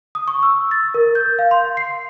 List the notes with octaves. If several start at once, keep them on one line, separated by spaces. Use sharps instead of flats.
D#6
C#6
E6
A6
A#4
G6
F5
C6
C7